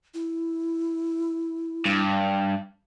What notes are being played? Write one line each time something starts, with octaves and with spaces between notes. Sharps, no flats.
E4
G2